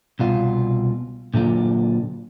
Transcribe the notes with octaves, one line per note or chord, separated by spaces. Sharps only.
C2 B2 F4
A#2 D3 F#3 F4